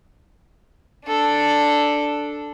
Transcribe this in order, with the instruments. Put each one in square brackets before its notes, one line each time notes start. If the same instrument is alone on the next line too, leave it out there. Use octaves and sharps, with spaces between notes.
[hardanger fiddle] D4 A4